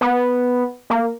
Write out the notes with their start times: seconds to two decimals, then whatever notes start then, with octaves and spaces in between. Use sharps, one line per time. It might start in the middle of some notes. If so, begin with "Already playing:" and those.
0.01 B3
0.90 A#3